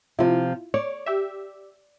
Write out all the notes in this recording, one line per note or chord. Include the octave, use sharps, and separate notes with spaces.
C3 F3 E4 F4
C#5 D5
G4 E5